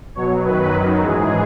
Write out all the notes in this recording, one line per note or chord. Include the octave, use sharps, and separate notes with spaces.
B2 F#3 C#5
F#2 D#3 F#3 B4
F#2 D#3 F#3
G#2 E3 G#3 G#4